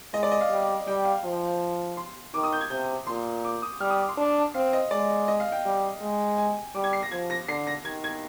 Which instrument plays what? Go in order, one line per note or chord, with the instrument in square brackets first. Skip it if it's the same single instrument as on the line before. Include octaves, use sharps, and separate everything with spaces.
[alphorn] G#3 [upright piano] D#5
[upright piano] D5
D#5
F5
[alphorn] G3
[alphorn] G3 [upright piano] G5
[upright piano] F5
[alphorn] F3
[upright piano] C6
[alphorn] D#3 [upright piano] D6
[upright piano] D#6
G6
G#6
[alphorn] C3 [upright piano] G6
[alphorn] A#2 [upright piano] C6
[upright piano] D6
D#6
[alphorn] G3 [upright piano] F6
[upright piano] D#6
D6
C6
[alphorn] D4
[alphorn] C4 [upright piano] F5
[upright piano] D#5
[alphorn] G#3 [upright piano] D5
[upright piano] D#5
F5
G5
[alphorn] G3
G#3
[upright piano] G#5
[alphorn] G3 [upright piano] D6
[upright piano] G#6
C7
A#6
[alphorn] F3 [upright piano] G#6
[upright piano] A#6
[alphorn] D3 [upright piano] C7
[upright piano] A#6
[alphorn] D#3 [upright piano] G#6
[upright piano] G#6